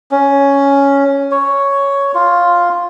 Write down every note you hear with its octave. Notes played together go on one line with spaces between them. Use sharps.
C#4
C#5
F4